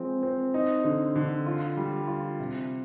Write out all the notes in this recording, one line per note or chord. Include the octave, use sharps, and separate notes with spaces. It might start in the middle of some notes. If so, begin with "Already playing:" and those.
Already playing: F3 G#3 C4
C4
D#4
D3
D3
F4
G3
F4
C3